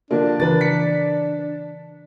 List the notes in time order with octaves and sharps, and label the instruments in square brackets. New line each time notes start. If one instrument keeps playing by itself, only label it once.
[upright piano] D3 F3 A#3 [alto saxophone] D4
[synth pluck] C#3 E3 [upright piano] A#4 B4 A6
[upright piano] B6 C#7